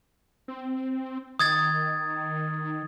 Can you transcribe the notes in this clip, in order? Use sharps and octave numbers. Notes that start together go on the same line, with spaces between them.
C4
D#3 D#6 G#6 A6